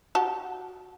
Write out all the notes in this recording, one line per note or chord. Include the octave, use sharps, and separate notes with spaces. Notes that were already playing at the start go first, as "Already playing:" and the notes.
F#4 G4 A5